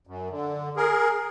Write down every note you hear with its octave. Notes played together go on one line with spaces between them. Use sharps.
F#2
D3
G#4 A#4